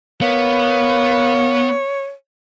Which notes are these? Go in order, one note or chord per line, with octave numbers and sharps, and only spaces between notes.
A#3 B3 C#5